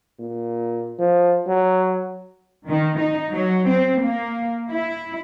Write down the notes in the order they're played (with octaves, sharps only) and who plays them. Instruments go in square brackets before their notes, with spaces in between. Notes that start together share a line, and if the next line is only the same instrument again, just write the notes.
[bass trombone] A#2
F3
F#3
[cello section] D#3
D#4
F#3
C4
A#3
E4